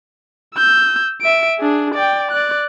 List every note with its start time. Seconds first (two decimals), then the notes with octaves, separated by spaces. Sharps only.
0.55 E6 G6
1.21 E5 D7
1.59 D4 G#4
1.95 D5 G5
2.31 D5 F#6